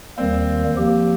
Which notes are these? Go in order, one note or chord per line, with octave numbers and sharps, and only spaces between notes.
D#2 D#3 G3 A#3 C4
F3 A#3 G4